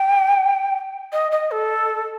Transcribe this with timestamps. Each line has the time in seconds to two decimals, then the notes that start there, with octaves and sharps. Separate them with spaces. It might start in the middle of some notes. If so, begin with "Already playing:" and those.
Already playing: G5
1.12 D#5
1.32 D#5
1.51 A4